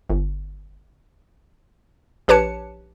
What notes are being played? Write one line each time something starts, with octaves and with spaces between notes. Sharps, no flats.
G1
A#1 G4 B4 C#5 A5 C#7